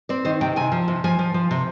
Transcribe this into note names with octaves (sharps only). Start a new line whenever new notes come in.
C4 D5
D#3 C5
C3 G5
C3 G#5
F3
C3
F3 G#5
F3
F3
C3